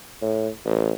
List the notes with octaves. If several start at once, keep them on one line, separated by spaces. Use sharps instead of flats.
A2
A1